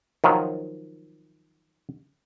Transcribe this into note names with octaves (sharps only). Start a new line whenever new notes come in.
D#3 F3 F#3